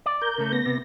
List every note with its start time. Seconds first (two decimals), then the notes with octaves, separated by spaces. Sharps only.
0.06 D5
0.22 A#4 G6
0.38 C#3 A3
0.53 B3 A#6
0.66 C3